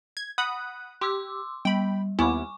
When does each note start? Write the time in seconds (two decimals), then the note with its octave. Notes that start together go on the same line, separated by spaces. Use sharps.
0.17 G#6
0.38 F#5 B5 D#6 F#6
1.01 G4 C6 D6 E6
1.65 G3 G5 B5
2.19 D#2 B3 E4 G#5 C#6 D6